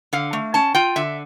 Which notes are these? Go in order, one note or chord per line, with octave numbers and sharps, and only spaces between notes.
D3 F5
A3
C#4 A5
F4 G5
D3 E5